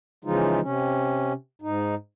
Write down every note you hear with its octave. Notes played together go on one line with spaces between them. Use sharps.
C#3 E3 F3 G#3 D#4 F4
C3 C#4
G#2 D#4